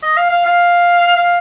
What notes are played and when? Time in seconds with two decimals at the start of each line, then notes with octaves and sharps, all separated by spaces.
0.03 D#5
0.17 F5
0.31 F5
0.46 F5
1.17 F5